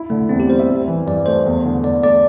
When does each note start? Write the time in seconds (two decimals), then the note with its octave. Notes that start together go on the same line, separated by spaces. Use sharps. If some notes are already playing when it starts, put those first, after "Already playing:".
Already playing: E4
0.10 D3 A3
0.29 E2 C4
0.40 G4
0.49 G3 C5
0.59 E5
0.69 C4
0.88 E3
1.06 G2 D5
1.26 A3 C5
1.46 E2
1.65 D3
1.84 E2 D5
2.03 A3 D5